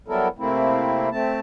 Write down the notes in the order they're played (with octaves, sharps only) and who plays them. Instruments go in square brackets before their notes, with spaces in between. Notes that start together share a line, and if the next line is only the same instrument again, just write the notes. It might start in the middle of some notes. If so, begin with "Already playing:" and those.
[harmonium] F#3 G3 B3 E4 A4 A#4
C3 A3 A#3 C4 E4
A3 C4 A5